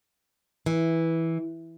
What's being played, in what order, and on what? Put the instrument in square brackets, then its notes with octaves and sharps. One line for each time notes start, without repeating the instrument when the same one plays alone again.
[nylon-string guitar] E3